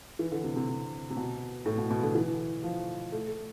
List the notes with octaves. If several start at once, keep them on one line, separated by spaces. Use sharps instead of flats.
E3
D3
C3
C3
C3
C3
B2
A2
B2
B2
D3
E3
F3
A3
A3